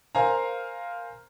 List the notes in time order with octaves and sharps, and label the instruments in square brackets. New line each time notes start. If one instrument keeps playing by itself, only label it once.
[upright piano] A#4 C5 F5 G#5 A#5